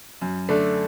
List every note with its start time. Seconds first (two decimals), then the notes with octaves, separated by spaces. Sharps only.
0.21 F#2
0.49 D3 A3 D4